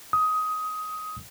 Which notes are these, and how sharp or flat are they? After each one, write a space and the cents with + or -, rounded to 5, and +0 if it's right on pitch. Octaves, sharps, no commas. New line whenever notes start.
D#6 +15